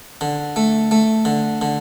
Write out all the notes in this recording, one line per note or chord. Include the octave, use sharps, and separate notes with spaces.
D3
A3
A3
D3
D3